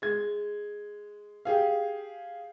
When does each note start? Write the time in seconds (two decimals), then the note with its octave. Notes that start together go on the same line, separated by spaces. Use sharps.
0.02 G#3 G#6
1.45 G4 G#4 F5